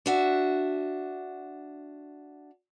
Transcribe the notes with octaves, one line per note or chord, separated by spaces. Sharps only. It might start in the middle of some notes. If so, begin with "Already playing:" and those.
D4 F#4 E5